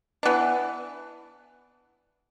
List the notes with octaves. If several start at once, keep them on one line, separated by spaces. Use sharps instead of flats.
E3 B3 D4